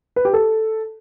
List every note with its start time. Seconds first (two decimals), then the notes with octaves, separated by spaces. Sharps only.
0.16 B4
0.25 G4
0.33 A4